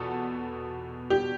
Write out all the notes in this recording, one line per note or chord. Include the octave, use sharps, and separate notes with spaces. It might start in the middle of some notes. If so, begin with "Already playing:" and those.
Already playing: E2 B2 B3 A4
G4